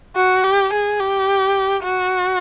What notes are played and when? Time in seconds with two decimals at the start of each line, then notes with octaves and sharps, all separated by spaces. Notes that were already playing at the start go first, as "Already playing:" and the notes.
0.16 F#4
0.44 G4
0.73 G#4
1.01 G4
1.84 F#4